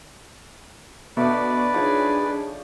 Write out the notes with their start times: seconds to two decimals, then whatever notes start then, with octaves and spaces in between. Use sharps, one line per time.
1.17 B2 A3 D4 B4 D5
1.74 F3 D4 D#4 G#4 C#5